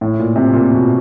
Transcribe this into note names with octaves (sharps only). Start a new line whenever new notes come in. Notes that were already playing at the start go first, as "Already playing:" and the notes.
A2
A#2
C3
A#2
B2